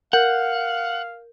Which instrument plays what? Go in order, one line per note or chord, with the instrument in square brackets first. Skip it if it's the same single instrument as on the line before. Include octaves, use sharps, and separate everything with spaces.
[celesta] A#4 G6 [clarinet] F5 [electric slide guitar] F#5